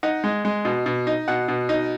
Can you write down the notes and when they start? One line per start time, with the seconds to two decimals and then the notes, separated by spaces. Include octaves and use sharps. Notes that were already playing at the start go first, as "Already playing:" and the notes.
0.03 D#4 F#5
0.24 G#3
0.45 G#3
0.65 B2
0.86 B2
1.07 D#4
1.28 B2 F#5
1.48 B2
1.69 D#4